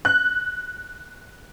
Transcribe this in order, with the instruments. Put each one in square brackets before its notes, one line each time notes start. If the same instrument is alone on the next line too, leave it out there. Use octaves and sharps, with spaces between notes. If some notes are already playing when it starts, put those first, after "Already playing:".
[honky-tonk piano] F#6